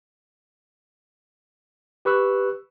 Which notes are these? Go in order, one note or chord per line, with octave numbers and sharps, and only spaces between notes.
G4 B4 C#6 E6 F#6